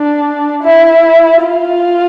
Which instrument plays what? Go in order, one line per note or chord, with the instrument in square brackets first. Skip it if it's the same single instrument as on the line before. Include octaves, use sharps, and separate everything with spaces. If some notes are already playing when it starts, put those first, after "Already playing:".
Already playing: [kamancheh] D4
E4
F4